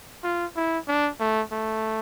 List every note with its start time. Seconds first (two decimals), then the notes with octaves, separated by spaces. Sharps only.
0.24 F4
0.56 E4
0.88 D4
1.20 A3
1.52 A3